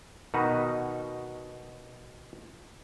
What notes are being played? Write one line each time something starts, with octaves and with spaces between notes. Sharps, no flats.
B2 D#3 D#4 F#4 B4